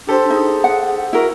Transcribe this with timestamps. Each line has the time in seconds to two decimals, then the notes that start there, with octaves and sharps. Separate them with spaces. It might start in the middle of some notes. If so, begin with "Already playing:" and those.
0.07 D4 G4 A4 C5
0.30 D#4 G#4
0.64 F#5
1.13 E4 F#4 A#4